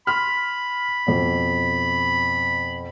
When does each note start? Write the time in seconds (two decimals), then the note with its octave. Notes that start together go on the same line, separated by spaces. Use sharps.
0.07 B5 C6 F6
1.07 F2 B2